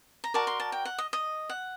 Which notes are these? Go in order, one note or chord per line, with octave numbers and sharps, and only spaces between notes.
A#5
F#4 A#4 D5 A5
C6
A5
G5
F#5
D#5
D#5
F#5